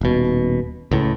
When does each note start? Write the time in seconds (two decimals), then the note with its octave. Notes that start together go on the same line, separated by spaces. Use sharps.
0.01 D#1 B2
0.91 C#2 A2